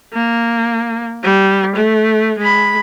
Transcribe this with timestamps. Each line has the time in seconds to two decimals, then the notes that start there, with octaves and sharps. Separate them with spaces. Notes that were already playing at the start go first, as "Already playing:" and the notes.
0.13 A#3
1.23 G3
1.75 A3
2.38 G#3 B5